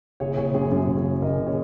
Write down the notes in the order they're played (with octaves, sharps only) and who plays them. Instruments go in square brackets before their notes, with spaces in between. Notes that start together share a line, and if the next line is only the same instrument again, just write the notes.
[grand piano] F#1 G#4 C#5
F#1 G#4 C#5
F#2 G#4 C#5
F#2 G#4 C#5
F#1
G#4 C#5
F#1
F#1 A#4 D#5
F#1
G#4 C#5